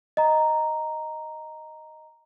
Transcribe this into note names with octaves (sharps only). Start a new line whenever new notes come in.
D#5 A#5